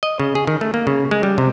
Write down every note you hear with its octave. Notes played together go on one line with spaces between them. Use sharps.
D#5
C#3
G#4
D#3
A3
A#3
C#3
G#3
G3
C3